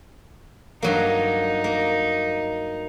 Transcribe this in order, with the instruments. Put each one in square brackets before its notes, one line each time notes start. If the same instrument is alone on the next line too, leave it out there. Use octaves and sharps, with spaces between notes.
[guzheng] G2 F#3 A#3 [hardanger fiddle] D#4
[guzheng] A#3